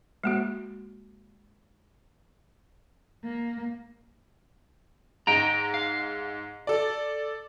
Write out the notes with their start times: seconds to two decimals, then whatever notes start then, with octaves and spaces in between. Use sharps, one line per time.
0.24 G#3 A#3 F#4
3.23 A#3
5.27 G#2 D#5 G5 A#5
5.74 F5
6.67 A4 D5